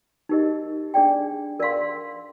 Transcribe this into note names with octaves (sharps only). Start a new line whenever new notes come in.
D#4 G4 A#4 D#5
D4 G#4 D5 G5
A#4 D5 F5 C6